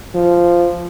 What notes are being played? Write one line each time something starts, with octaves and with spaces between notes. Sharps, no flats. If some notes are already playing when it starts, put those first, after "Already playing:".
F3